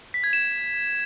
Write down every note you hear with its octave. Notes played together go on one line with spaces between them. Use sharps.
B6
G#6
E7